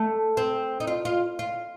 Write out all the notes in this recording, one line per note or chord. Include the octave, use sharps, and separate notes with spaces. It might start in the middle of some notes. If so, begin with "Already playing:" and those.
Already playing: A3
C4
D#4
F4
F4
F4